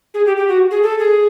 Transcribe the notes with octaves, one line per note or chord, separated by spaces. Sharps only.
G#4
G4
G4
F#4
G#4
A4
G#4